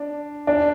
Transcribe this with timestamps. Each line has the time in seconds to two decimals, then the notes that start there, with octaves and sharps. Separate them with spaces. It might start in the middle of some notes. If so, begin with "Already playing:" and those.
Already playing: D4
0.47 D4